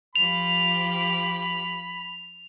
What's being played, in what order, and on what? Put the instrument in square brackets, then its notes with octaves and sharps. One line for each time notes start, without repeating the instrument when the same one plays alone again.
[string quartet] F3 F4 G4 [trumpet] B5 [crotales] F7